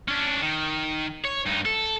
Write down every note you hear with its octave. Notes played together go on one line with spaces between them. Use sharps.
C#4 D4
D#3
C#5
G2 D#4
A4